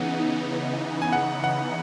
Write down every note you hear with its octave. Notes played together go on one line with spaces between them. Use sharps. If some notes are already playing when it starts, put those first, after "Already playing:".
Already playing: C#3 E3 B3 D#4 F#5
G#5
F#5
F#5